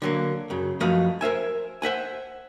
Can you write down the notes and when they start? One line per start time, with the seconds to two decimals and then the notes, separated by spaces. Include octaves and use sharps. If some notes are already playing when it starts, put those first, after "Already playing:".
0.02 D3 F#3 A#3
0.50 F#2 C#3
0.80 F#2 F3 A3 B4 D#5 F5
1.21 A#4 C5 E5 G#5
1.82 C5 E5 F#5 G#5